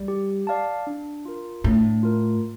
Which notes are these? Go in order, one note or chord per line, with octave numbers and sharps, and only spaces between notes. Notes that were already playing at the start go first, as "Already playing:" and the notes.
Already playing: G3
G4
D5 F5 A5
D4
F4 A#4
A2 D4
F4 A#4